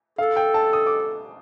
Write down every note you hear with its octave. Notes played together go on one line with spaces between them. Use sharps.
A4 F5
G5
A5
D#6
D6